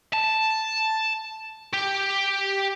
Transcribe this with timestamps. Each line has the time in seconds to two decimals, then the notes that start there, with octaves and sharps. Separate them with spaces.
0.13 A5
1.73 G4